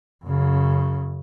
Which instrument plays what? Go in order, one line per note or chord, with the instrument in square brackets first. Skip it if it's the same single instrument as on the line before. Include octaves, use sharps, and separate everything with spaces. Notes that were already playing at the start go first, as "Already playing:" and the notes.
[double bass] F#2 C#3